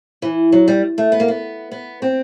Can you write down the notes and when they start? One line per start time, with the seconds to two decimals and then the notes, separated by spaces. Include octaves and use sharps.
0.22 E3
0.52 F#3
0.68 G3
0.98 A3
1.12 B3
1.20 A#3
1.28 B3
1.71 B3
2.02 C4